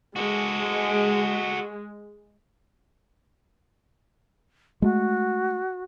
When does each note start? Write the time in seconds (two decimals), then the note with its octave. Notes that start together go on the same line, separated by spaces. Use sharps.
0.16 G#3 F#4 A4
4.82 G#3 A3 F#4